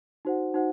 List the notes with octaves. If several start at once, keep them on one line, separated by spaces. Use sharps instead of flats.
D#4 F#4 C5 F#5
D#4 F#4 C5 F#5